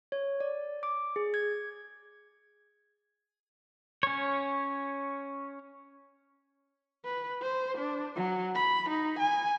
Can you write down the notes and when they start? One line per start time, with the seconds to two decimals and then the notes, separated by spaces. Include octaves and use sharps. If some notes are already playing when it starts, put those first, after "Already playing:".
0.12 C#5
0.40 D5
0.83 D6
1.16 G#4
1.34 G#6
4.03 C#4 C#5
7.05 B4
7.41 C5
7.78 D4
8.16 F#3
8.55 B5
8.89 D#4
9.19 G#5